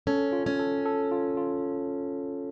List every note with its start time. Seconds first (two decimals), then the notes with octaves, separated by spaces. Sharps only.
0.07 C#4 A4
0.32 F4
0.46 C#4
0.59 A4
0.86 A4
1.11 F4
1.37 F4